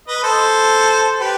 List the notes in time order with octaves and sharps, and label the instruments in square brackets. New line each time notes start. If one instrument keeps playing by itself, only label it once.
[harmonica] B4 D#5
A4 C5
G4 B4